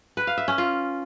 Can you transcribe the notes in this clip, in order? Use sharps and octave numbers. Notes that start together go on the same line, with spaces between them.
B4
F5
E5
C#4
F4